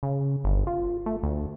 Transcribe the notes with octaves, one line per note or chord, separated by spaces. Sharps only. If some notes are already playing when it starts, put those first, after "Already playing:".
C#3
G1
F4
A3
D2